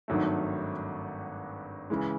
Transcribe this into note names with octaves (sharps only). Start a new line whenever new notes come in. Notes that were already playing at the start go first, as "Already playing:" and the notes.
G#1 G2 D#3 F#3 A3
C#3 E3 G#3